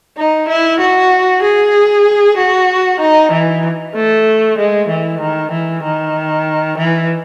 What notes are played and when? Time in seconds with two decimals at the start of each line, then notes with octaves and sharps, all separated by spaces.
0.17 D#4
0.49 E4
0.80 F#4
1.43 G#4
2.37 F#4
3.00 D#4
3.32 E3
3.95 A3
4.58 G#3
4.89 E3
5.21 D#3
5.52 E3
5.83 D#3
6.78 E3